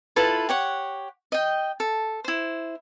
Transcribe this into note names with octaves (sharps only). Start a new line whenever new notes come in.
E4 F4 A4 B4
G4 C#5 F#5
D#5 G5
A4
E4 C5